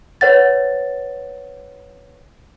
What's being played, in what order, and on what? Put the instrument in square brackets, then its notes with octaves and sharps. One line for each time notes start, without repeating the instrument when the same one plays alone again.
[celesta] B4 C#5 F#5 A6